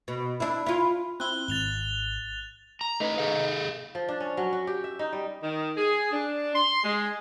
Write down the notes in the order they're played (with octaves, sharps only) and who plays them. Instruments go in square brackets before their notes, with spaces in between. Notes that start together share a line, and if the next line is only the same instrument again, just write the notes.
[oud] B2
D4 E4
E4 F4
[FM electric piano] C4 E4 [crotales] F#6 G7
[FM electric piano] G#1 [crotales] A6 F7 G7
[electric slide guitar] A#5
[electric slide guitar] A3 B4 [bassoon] D#4
[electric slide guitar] G#4 A4 F5
[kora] F3
D4
C#4
F#3
F#4
G4
E5
D#4
G3
[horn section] D#3
G#4
D4
C6
G#3